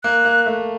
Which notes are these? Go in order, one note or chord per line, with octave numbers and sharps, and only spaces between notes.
A#3 F#6
A#3
A3